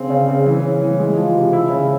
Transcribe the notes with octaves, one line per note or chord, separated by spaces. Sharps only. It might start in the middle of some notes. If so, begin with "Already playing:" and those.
Already playing: C#3 C4
C#3
C#3
E3
C#4
E3
G#3
F3
C3
E4
C#3